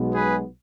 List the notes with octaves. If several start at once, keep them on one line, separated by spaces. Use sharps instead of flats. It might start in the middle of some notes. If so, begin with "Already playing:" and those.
Already playing: B1 B2 G#3 B3
G#4 B4